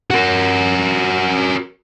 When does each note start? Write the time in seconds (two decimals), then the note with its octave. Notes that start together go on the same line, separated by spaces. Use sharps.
0.11 F#4 A#4